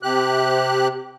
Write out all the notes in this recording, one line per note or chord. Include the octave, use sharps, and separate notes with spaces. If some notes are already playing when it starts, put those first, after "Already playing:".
C3 G4 F#6